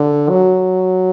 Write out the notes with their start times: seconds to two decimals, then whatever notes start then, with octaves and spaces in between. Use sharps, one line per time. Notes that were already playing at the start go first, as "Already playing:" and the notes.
Already playing: D3
0.30 F#3